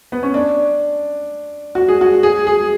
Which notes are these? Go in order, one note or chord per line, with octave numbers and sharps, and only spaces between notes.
B3
C#4
D4
F#4
G#4
F#4
G#4
G#4